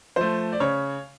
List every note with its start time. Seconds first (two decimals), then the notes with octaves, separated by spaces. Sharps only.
0.16 F3 A3 C5
0.53 D5
0.60 C#3 C#5